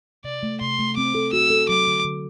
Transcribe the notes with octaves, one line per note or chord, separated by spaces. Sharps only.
C3 D5
A3
C3 C6
A3
C4 D6
A4
F#4 E6
A4
F#3 D6
D3
D3